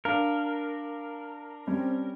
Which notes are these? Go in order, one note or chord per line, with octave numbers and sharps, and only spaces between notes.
D4 A#4 F5
G3 C4 C#4